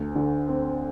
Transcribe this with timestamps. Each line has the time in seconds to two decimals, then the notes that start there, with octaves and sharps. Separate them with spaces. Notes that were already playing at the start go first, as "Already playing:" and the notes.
Already playing: D2
0.15 D3
0.48 C4